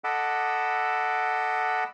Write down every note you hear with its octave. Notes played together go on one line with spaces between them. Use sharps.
A4 D#5 F#5 B5 D6 E6